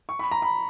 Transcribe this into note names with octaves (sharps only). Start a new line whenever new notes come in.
C#6
B5
A#5
B5